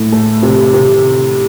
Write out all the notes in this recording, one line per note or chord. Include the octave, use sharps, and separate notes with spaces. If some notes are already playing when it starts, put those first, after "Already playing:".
Already playing: A2
A3
C3
C3